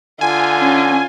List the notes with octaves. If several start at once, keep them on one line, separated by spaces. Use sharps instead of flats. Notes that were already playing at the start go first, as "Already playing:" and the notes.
D3 F4 G#5
C#4